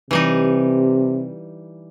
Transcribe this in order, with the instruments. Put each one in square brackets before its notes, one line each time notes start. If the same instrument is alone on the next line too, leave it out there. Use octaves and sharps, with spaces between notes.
[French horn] C3 [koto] E3 G3 D#4